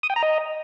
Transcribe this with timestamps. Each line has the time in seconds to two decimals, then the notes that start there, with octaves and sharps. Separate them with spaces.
0.03 D#6
0.10 G5
0.16 A#5
0.23 D#5